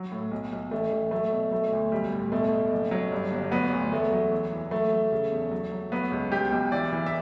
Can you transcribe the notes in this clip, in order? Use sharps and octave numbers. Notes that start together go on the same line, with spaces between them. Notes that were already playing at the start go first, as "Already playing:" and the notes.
Already playing: F#3
A2
B1
B1
A1 A3
A1
F#3 A3
B2
F#3 A3
D2
B1 G3
A2
B2 A3
B2
F#1
F#3
G2
G1
F#3 B3
D2
E2 A3
F#3
E3
E3
F#3 A3
F#3
C#3
E2
F#3
F#3
F#3 B3
C#2
B1 G4
B1
E3 D5
E3
E5